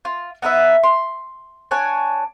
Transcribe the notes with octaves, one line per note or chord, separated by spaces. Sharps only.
F4
B3 D#4 B4 E5
C6
D4 C#5 F#5 G#5